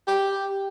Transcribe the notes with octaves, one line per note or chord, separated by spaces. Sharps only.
G4